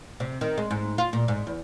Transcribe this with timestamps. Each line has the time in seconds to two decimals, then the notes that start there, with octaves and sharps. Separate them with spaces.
0.20 C3
0.41 D#3
0.58 G#3
0.71 G#2
0.98 F4
1.13 A#2
1.28 G#2
1.47 E2